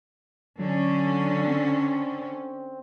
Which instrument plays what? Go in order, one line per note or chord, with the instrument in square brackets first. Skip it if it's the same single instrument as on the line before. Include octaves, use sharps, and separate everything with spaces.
[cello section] D3 C#4 [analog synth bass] F#3
[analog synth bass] C4